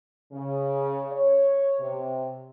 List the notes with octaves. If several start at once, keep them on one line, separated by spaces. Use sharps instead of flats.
C#3
C#5
C3